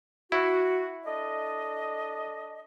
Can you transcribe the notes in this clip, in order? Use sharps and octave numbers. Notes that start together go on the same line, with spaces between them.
E4 F#4
D4 A4 D#5